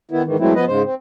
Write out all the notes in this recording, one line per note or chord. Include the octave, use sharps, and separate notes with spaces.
D#3 B3 E4
G#2 D#3 E3
E3 F#3 G#3 A3 C4 E4
F3 B3 B4 D#5
G#2 C#3 G#3 C5
C4